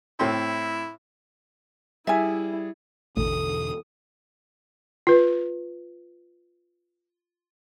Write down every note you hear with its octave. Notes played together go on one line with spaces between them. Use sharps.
A2 C4 E4 C6
G3 E4 G#4 E5 G#5 G#6
A1 E2 B2 D3 A4 D#6
F4 B4